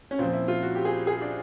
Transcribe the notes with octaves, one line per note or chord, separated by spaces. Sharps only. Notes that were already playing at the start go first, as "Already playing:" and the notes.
C#4
A#2 F3 C4
E4
F4
F#4
G4
G#4
G#4
D4